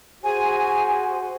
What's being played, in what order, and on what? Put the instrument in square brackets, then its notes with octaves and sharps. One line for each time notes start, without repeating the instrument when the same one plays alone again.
[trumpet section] F#4 C5 [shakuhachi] G#4 [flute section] G#5